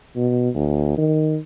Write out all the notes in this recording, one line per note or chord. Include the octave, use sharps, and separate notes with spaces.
B2
D2
D#3